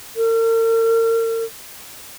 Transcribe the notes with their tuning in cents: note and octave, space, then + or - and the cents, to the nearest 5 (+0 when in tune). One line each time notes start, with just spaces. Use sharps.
A#4 -40